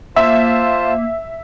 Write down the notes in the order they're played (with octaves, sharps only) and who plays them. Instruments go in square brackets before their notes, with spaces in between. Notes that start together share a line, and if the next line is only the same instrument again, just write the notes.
[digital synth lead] A#3 [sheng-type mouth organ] F4 C5 A5 [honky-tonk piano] E5